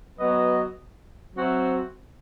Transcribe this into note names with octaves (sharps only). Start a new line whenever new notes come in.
F#3 B3 F#4 B4 D#5
F#3 C4 F#4 C5 E5